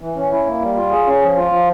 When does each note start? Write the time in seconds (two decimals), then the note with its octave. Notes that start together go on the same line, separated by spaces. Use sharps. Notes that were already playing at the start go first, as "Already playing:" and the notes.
0.01 E3
0.16 C#4
0.32 E4
0.47 A#3
0.61 G3
0.76 F4
0.91 G#4
1.07 C#4
1.22 F3
1.36 F4
1.52 F3